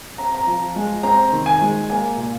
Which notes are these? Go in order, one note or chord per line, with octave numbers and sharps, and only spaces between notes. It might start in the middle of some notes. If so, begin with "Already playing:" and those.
C4 A#5
A#5
F3
G#3
C4 A#5
D#3
G#5
G#3
A#3 G#5
A#2